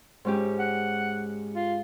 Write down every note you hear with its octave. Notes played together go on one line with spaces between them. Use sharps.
G#2 C#4 G4
F#5
F4